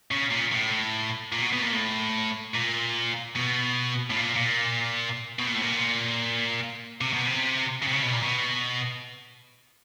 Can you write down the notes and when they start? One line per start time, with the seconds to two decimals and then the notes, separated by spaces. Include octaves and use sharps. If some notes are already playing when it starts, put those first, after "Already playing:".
0.11 C#3
0.31 A#2
0.51 A2
1.33 A#2
1.42 B2
1.53 B2
1.62 A#2
1.73 A2
2.54 A#2
3.36 B2
4.10 A2
4.17 A#2
4.36 A#2
5.39 B2
5.46 A#2
5.54 A2
5.62 A#2
7.01 C3
7.13 B2
7.26 C3
7.82 C#3
7.87 C3
7.92 C#3
8.03 B2
8.13 A#2
8.23 B2